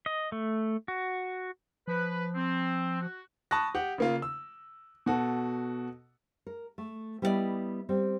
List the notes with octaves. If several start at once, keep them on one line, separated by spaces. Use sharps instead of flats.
D#5
A3
F#4
F3 B4
C4
F#4
A5 B5 C#6 D#6 F#6 A#6
G4 F#5
C#3 A#3 F4
E6
B2 F#4 A4
A#4
A3
G3 B3 E4 F#4 D5 D#5
G3 C4